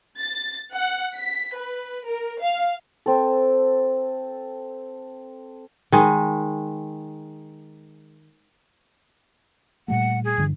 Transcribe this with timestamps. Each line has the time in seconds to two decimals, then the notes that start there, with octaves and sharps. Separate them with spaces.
0.18 A6
0.75 F#5
1.16 B6
1.56 B4
2.06 A#4
2.41 F5
3.06 C4 A4
5.92 D#3 G#3
9.88 A#2 G3 A3 F#5
10.24 G#4
10.38 G2 D3 E3